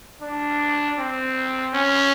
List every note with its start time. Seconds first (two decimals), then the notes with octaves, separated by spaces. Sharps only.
0.22 D4
0.98 C4
1.74 C#4